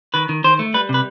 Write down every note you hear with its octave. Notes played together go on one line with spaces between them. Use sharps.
D#3 B4
D#3
D#3 C5
A3
G3 B4
C3
B4